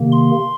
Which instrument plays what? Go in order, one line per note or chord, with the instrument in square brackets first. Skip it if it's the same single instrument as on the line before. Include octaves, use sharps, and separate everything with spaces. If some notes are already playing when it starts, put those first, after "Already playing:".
Already playing: [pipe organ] C3 D#3 A#3
C6